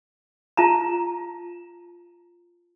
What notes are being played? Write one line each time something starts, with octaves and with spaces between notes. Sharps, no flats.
F4 A5 A#5